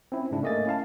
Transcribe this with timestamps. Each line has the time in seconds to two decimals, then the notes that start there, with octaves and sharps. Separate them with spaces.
0.12 C4 C#4 E4
0.31 G#2 C#3 C#4 D4 E4
0.43 A3 A#3 D#5 G#5 A6
0.66 C#4 E4 F5 A5